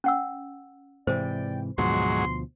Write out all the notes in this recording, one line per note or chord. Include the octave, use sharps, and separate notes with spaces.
C#4 F#5 E6
G#2 C3 E3 C5 D5 G5
D2 G#2 B2 F3 F#3 C6